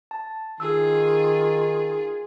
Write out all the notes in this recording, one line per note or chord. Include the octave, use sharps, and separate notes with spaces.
A5
D#3 F4 G#4 E6